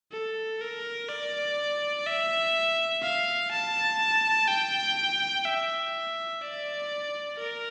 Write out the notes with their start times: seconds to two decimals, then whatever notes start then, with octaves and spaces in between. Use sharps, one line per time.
0.12 A4
0.61 A#4
1.09 D5
2.06 E5
3.02 F5
3.51 A5
4.48 G5
5.45 E5
6.42 D5
7.38 A#4